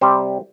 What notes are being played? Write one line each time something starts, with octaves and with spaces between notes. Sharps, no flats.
C3 G3 C4 G4 C5